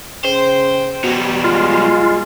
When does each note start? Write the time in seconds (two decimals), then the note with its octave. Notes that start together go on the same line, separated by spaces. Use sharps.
0.25 C#3 C5 G5
1.04 B2 F#3 G3
1.44 G#3 F4